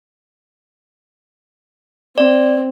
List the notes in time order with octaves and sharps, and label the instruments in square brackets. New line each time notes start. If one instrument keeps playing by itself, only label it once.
[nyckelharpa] C4 [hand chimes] D5